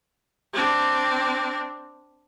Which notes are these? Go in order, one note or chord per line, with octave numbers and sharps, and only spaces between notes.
C4 D4